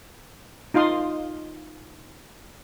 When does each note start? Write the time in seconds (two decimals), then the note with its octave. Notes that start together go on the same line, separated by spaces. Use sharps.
0.74 D#4 F4 F5 C6 D#6